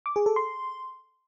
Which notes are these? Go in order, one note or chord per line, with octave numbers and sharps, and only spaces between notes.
D6
G#4
A4
C6